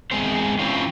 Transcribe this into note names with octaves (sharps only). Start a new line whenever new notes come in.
E2 G#3 C4 C5
E3 C4 C#4 F4